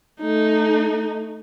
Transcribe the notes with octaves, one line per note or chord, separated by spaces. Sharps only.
A3 D#4